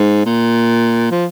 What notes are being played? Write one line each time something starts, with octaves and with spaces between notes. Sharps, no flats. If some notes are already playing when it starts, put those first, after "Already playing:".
Already playing: G#2
A#2
F3